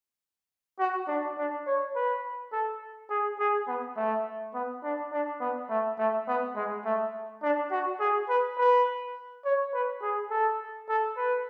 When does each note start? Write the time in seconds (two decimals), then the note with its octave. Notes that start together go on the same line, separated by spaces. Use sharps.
0.79 F#4
1.08 D4
1.38 D4
1.67 C#5
1.96 B4
2.52 A4
3.10 G#4
3.39 G#4
3.67 B3
3.96 A3
4.54 B3
4.83 D4
5.13 D4
5.40 B3
5.69 A3
5.98 A3
6.28 B3
6.56 G#3
6.85 A3
7.43 D4
7.71 F#4
8.00 G#4
8.29 B4
8.58 B4
9.45 C#5
9.74 B4
10.02 G#4
10.30 A4
10.89 A4
11.17 B4